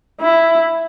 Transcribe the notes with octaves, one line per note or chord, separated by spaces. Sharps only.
E4